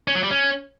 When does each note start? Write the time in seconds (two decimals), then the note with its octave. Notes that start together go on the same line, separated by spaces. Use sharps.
0.08 C#4
0.15 F#3
0.23 G3
0.31 C#4